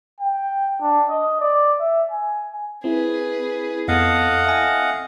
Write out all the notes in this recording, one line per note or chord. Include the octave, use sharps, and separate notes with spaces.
G5
D4
D#5
D5
E5
G#5
C4 E4 G#4 B4
F2 B3 A4 D#5 F5 F#5
E5 G#5